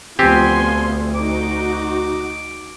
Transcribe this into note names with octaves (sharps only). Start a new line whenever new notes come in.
D2 F3 B3 C4 G4 G#5 C6
D#4 F#4 D6